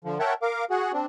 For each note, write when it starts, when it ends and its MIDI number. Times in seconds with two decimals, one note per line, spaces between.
0.04 0.18 50
0.04 0.18 53
0.20 0.34 70
0.20 0.34 73
0.20 0.34 76
0.20 0.34 78
0.20 0.34 79
0.20 0.34 81
0.42 0.65 70
0.42 0.65 77
0.42 0.65 86
0.70 0.92 66
0.70 0.92 68
0.70 0.92 78
0.93 1.06 60
0.93 1.06 62